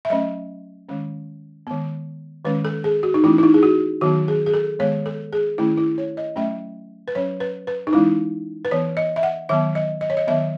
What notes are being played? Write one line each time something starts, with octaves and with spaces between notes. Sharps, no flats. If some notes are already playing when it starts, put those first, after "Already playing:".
E5
F#3 A3 C#4 D#5
D#3 G#3 C#4
D#3 G#3 B3
D#3 G#3 C#4 B4
A4
G#4
F#4
D#4
E3 A3 C#4 E4
E4
D#4
G#4
F#4
D#3 F#3 B3 F#4
G#4
G#4
A4
D#3 G#3 B3 C#5
A4
G#4
D#3 A3 C#4 E4
E4
C#5
D#5
F#3 A3 C#4 E5
B4
F#3 C#4 C#5
B4
B4
D#4
E3 G#3 C#4 E4
B4
E3 B3 C#5
D#5
E5
F#5
D#3 F#3 B3 E5
D#5
D#5
C#5
D#5
D#3 F#3 B3 E5